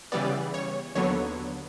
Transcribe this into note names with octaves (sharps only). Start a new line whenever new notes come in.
C#3 E3 G3 B3 D5
C#5
D#2 D3 F#3 B3 C#5